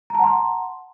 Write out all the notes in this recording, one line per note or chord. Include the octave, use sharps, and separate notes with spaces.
F#5 A5 A#5 C6